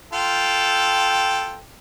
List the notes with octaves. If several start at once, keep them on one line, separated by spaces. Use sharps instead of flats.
F4 A4 G5